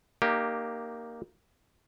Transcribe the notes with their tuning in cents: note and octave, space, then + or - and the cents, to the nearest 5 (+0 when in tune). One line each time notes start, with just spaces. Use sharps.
A#3 +0 D#4 -20 G4 +0